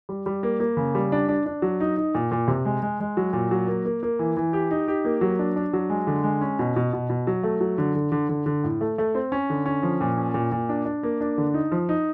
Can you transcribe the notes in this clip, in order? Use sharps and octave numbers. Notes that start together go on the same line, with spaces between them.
G3
G3
A#3
A#3
C#3
G3
D4
D4
D4
F#3
D#4
D#4
A#2
A#2
C3
G#3
G#3
G#3
F#3
A#2
F#3
A#3
A#3
A#3
E3
E3
G4
D#4
G4
A#3
F#3
D4
D4
F#3
G#3
D3
G#3
C#4
B2
B2
B2
B2
F#3
A3
F#3
D3
D3
D3
D3
D3
A2
A3
A3
C4
C#4
D3
C#4
F3
A#2
C#4
A#2
A#2
D4
D4
A#3
D4
D3
D#4
F3
D#4